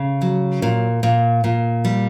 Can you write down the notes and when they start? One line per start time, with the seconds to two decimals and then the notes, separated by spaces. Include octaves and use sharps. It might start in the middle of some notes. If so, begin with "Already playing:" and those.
Already playing: C#3
0.21 F#3
0.62 A#2
1.03 A#2
1.44 A#2
1.85 G3